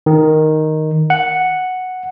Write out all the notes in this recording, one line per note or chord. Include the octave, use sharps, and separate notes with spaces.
D#3
F#5